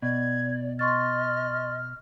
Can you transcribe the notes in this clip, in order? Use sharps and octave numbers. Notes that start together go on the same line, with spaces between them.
B2 D5 G#6
D#5 C6 C#6 F6 A6